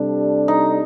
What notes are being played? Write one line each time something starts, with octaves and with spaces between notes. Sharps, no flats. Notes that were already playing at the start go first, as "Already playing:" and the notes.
Already playing: C3 G3 D4 A4
D#4